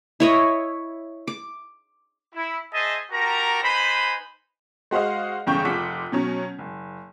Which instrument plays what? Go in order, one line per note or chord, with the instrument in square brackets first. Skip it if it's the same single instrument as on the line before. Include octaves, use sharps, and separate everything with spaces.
[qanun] E4 C#5 D#5
D6
[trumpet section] E4
G#4 C5 D#5 E5 G#5 A5
F#4 G4 A#4 A5 A#5
D#4 B4 C5 G#5 B5
[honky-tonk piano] G#3 F#4 C5 D#5 F5
G1 E2 C#3 G5 C#6 G6
F1 F4 F#5 D6 B6
B2 F#3 C#4
F#1